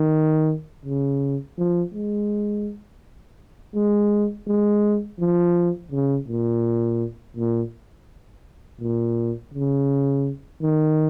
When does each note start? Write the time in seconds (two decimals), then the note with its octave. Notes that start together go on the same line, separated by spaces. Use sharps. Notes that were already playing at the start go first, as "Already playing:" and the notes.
Already playing: D#3
0.86 C#3
1.58 F3
1.94 G#3
3.75 G#3
4.47 G#3
5.19 F3
5.92 C#3
6.28 A#2
7.37 A#2
8.81 A#2
9.54 C#3
10.62 D#3